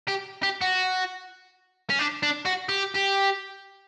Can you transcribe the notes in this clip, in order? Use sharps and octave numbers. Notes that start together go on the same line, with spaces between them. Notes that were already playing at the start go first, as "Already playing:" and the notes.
G4
G4
F#4
C#4
D4
D4
F#4
G4
G4